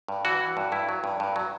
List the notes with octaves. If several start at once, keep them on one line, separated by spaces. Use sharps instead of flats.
G2
E3 F#4
E3
G2
G2 E4
F#3
G2
G2
F#3